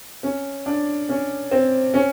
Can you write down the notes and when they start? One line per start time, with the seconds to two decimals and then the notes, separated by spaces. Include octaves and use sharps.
0.23 C#4
0.66 D4
1.09 C#4
1.51 C4
1.94 C#4